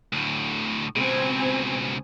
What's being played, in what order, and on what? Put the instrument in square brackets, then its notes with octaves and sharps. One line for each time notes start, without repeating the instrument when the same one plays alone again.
[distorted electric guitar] D2 A2
[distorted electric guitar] C#2 B2 [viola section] C4 G#5